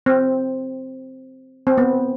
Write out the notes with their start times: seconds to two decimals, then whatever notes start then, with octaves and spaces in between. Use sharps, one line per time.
0.06 C4
1.67 C4
1.78 B3